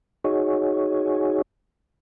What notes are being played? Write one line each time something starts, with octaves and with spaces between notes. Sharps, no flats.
D#4 F#4 G#4 C#5